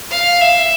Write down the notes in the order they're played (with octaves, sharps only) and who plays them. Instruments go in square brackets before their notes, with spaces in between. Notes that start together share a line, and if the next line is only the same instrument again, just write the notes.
[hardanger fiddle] F5
E5